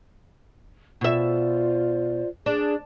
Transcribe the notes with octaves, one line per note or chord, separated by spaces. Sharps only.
B2 F4 C5 D5 E5
D4 G#4